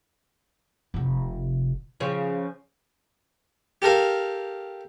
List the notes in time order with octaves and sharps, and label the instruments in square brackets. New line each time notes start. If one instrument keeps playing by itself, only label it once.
[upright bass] F1 C3
[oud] C#3 F3
[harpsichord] G4 A4 A#4 F5